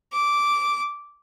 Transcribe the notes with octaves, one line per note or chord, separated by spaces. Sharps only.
D6